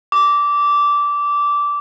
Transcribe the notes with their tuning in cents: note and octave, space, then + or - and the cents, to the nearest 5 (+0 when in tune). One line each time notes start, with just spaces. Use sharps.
D6 -15